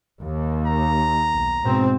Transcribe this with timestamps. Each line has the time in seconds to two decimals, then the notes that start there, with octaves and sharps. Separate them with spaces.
0.20 D#2
0.66 A#5
1.33 B1
1.63 G#2 B2 C4